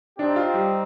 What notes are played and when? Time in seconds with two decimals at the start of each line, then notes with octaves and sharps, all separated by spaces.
0.18 C4 D4 D#4 G4
0.36 F4
0.54 G3